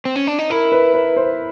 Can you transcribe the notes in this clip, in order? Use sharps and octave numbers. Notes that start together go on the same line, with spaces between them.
C4
C#4
D4
D#4
E4 A#4
B4
B4
C5